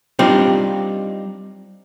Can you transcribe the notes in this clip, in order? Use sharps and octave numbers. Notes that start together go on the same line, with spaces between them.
G3 C4 D4 D#4 F4